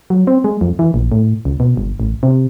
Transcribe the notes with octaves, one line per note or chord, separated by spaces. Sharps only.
F#3
C4
G#3
F2
E3
A#1
A2
C#2
B2
G1
A1
C3